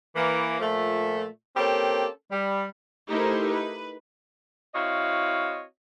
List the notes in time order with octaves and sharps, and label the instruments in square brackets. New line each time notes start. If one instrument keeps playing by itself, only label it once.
[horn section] E3 A#3
A#2 F3 A3
A#3 C4 C#4 G4 A4
G3
[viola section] A3 D#4 E4 G4 A#4 C5
B4
[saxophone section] C4 E4 F#4 C#5 D#5 F5